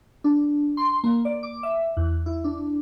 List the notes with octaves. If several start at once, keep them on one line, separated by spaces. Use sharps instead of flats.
D4
C6
A#3
D5
D6
E5
E2
E4
D4